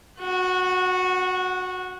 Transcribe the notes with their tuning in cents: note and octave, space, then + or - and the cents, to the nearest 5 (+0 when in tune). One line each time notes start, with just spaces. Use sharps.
F#4 -15 F#5 +25